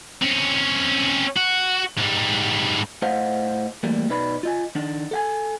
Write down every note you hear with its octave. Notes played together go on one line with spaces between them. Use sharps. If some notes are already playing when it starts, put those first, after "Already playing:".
C4 C#4
F#4
G#2 G3
A2 C5 D#5 F5 F#5
E3 G3 A3 A#3
B2 D#4 B4 D5 B5
F4 D#5 G#5
D#3 D4 D#4
A4 F#5 G#5